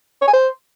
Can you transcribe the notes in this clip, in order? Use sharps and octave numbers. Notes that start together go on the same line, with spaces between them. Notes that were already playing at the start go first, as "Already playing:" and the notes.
C#5
G#5
C5